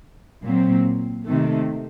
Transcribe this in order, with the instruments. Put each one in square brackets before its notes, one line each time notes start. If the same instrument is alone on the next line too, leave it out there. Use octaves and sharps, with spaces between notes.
[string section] A#2 F#3 C4
C3 D#3 A3